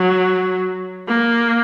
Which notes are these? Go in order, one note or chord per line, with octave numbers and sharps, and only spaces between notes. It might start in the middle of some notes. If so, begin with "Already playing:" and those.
Already playing: F#3
A#3